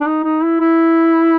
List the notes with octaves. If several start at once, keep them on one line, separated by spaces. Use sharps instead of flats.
D4
D#4
D#4
E4
E4